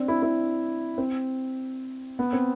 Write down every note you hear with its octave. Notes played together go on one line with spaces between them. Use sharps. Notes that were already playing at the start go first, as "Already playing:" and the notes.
Already playing: C4 D4
E4
E4
C4
B3
C4